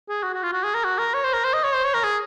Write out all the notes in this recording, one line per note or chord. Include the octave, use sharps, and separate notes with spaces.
G#4
F#4
F#4
F4
F#4
G#4
A#4
F#4
A#4
C#5
C5
A#4
C5
D#5
C#5
C5
C#5
A#4
G#4